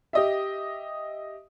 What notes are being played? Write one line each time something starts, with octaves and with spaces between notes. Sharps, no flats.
G4 D#5 E5